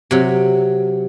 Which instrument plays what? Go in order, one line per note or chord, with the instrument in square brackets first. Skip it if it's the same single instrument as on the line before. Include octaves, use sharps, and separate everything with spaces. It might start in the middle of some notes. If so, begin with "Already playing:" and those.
[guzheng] C3 F#3